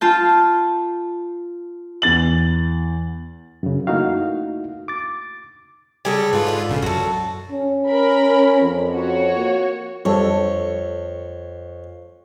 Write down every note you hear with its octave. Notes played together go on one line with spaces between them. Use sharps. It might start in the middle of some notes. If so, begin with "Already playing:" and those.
F4 A5 G6
E2 A6 F#7
F#2 C#3
A3 A#3 D#4 E4 F#4 F5
D6 A6
C#3 G3 G4 A4 G#5
G#2 F4 B4
D3 B4
A#1 C#3
F#2 F#4 A4
C#4
A#4 B5
F2
F#4 C#5
A#3
F2 G3 A4 C#5